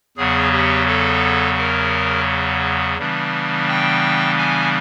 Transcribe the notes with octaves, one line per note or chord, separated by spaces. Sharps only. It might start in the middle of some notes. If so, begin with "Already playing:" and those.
E2 C#3 F#3 B3 G#4
G4
A4
A#4
C#3 E3 G3 B3 D4
G5
G#5